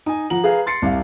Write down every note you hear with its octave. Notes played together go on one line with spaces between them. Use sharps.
D#4 G#5
F3 F#5 A#5 F#7
G#4 B4 F5 A#5
C6 A6 C7 C#7
C2 C3 F5